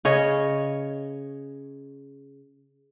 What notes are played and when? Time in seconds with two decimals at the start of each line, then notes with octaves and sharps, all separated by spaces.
0.05 C#3 C#5 D#5